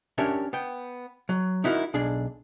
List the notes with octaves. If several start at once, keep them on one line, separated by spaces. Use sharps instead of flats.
C#4 D4 G4 A#4 C#5 E5
B3 G5
F#3
D#4 E4 F#4 A4 A#4
B1 D4 G#4